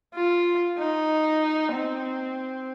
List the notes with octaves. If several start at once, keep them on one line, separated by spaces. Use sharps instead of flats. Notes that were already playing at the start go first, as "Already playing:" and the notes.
F4
D#4
C4